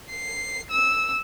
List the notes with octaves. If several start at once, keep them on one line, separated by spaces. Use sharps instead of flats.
C7
E6